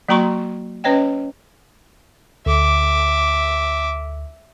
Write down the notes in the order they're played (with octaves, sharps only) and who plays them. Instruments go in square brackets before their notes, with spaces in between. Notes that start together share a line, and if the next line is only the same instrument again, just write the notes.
[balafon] F#3 A#3 F#4 A#5 C6 C#6
C#4 B4 C#5 D#5 G5
[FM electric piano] D2 [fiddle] E5 D6